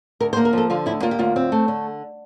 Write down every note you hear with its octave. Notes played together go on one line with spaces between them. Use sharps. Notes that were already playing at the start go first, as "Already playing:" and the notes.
D2 A#4
C5
A#3
A#4
F3 A4
D3 F4
D2 E4
A#3 F4
G4
D2 F4
C4
A3
D3